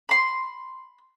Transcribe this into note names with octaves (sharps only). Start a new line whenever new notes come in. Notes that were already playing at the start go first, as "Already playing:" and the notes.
B5 C6